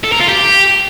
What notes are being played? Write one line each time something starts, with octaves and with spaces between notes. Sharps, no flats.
A4
A#4
F4
G4